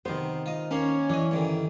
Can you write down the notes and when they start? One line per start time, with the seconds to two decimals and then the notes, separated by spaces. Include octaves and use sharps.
0.05 C3 D#3 B3 C5
0.46 F4 D#5
0.71 D#2 A#3 C#4 C6
1.10 E3 D4 D#5
1.31 G2 D3 D#3